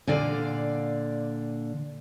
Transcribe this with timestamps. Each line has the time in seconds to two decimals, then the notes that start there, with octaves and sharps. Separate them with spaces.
0.07 A#2 D3 D5 F5